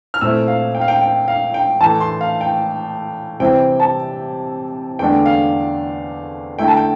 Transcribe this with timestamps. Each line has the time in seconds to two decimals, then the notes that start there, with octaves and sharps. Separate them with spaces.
0.14 F6
0.21 A#2 A3 C4 E4 E6
0.48 F5
0.75 G5
0.81 F5
0.88 G5
1.01 G5
1.28 F5
1.54 G5
1.81 A2 E3 A3 A5
2.00 C6
2.21 F5
2.41 G5
3.40 C3 E3 G3 C4 E4 G5
3.80 A5
4.99 E2 D3 A3 D4 G5
5.26 F5
6.59 D3 A3 E4 G5
6.68 A5
6.77 G5